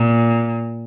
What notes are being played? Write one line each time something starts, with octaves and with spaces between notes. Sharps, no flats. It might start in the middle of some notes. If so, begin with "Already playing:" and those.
Already playing: A#2